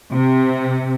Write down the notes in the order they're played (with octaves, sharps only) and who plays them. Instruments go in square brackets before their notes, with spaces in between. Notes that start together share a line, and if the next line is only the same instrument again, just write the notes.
[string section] C3